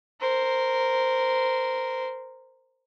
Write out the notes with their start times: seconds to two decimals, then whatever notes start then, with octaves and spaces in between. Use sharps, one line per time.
0.20 A#4 C5